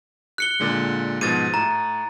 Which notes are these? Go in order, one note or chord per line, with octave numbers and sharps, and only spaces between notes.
F#6 C#7 G7
A#2 D3 G#3
G#2 B2 F3 A6 D#7
A2 A#5